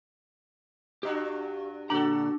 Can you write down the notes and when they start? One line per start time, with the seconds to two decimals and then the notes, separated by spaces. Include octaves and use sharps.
1.03 G2 D4 F#4 G4
1.90 A#2 D3 D4 F#4 A4 A#5